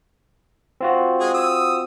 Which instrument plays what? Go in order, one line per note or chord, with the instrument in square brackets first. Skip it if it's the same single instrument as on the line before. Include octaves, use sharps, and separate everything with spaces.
[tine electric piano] C4 F4 F#4
[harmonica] G#3 G#4
D#6 E6